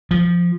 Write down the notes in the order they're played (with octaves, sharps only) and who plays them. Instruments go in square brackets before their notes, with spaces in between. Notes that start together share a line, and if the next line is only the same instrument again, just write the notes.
[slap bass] F3